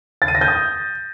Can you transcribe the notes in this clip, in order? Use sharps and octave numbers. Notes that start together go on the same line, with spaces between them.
A6
D#7
A#6
G6
D#6